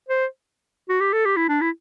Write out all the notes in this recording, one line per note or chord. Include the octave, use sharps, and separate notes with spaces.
C5
F#4
G4
A4
G4
E4
D4
E4